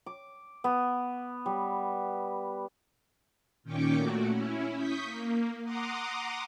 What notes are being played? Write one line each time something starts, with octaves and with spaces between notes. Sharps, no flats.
D6
B3
G3
A#2 D#3 C#4 G5 C#6 D6
A#2 A3 F#4
C#4 E4
C#6 D#6 G6 B6
A#3
F#5 A#5 C6 D6 D#6